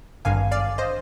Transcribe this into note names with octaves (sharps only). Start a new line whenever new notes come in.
G#1 G2 D3 F5 G#5
D5 F5
C5 D#5